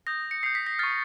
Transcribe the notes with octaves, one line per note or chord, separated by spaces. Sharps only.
D#6 G6 A#6
C#7
D#6 G6 C7
B6
A#6
C#6 F6 A6